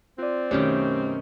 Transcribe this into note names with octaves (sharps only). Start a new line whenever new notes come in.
C4 F4 D5
F#2 B2 D#3 A3 C#4 G4